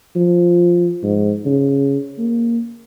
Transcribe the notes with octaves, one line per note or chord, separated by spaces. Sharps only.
F3
G#2
C#3
A#3